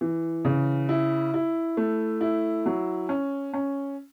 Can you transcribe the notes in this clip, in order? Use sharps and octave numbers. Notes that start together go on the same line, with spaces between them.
E3
C#3
E4
E4
A3
E4
F#3
C#4
C#4